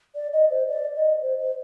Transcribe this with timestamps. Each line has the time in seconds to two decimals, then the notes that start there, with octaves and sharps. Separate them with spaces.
0.15 D5
0.33 D#5
0.50 C5
0.68 D5
0.95 D#5
1.22 C5
1.39 C5